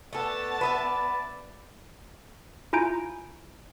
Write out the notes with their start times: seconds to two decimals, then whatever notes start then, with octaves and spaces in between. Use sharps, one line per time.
0.13 A3 B3 A4 D5 A5
0.61 B4 D#5 E5
2.73 E4 F4 G#5 A#5 G6 D7